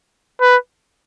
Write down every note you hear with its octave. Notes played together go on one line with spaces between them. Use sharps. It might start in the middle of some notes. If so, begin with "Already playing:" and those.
B4